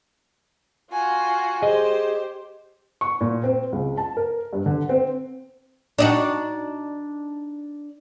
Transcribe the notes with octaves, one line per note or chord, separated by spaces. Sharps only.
F4 F#4 G#5
G4 G#4 C5 D#5
C#6
A#2
C4
C#2
A5
A#4
G2
D3
C4
D4 D#4 F#4